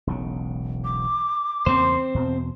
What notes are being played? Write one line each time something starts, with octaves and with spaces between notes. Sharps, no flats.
E1 B1 C#3
D6
E2 C#3 A#3 C4 C5
E2 B2